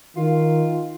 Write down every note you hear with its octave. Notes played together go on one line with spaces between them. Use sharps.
D#3 F4